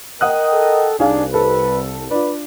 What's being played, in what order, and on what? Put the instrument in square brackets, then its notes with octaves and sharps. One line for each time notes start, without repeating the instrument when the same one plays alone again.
[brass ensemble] A#4 D#5 G5 [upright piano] F#5 D#6 F#6
[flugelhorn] A4
[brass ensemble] C2 [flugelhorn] D4 [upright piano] D#4 G#4 F5
[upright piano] A4 [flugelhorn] B4
[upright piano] D4 F4 [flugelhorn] B4 [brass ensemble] D5